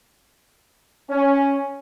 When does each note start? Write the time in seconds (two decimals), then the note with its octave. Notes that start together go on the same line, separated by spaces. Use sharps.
1.08 C#4